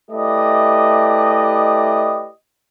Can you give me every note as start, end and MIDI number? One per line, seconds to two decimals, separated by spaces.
0.11 2.30 57
0.11 2.30 64
0.11 2.30 67
0.11 2.30 71
0.11 2.30 74
0.11 2.30 75